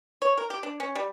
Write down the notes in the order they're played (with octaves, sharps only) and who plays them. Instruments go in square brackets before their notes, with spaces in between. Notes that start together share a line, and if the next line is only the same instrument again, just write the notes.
[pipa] C#5
A#4
G4
D4
C#4
G3